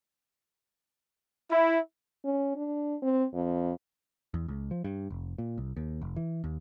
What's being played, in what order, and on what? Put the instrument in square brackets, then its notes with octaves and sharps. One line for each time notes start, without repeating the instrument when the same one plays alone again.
[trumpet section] E4
[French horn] C#4
D4
C4
F2
[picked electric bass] E2
C#2
F3
G2
F1
A#2
C2
D#2
F1
E3
D#2